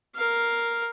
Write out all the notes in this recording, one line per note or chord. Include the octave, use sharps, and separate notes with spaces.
A#4 F5